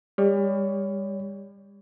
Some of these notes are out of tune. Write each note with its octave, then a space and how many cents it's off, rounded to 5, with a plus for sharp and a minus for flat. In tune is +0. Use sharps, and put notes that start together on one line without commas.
G3 +35 C#5 +30